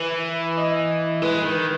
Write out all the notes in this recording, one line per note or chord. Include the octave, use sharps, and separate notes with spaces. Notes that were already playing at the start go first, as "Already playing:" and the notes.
Already playing: E3 B4
D#5
G#3 B4
D#3